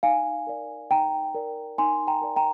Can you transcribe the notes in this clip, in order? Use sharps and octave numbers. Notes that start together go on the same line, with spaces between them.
D#4 F5 G#5
A#4 D5
D#4 G5 A#5
A#4 D5
D#4 G#5 C6
G5 A#5
A#4 D5
G5 A#5